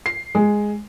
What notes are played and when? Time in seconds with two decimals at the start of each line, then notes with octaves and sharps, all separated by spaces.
0.06 C7
0.35 G#3